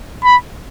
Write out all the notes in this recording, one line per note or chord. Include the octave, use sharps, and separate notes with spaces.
B5